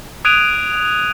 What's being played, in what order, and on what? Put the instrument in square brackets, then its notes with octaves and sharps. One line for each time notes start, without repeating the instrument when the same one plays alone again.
[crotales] D#6 F#6 G#6 D7 D#7 F7